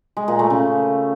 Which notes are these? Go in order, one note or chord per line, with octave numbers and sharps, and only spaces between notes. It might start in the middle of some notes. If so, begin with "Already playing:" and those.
G#3
A#2
A3
C#3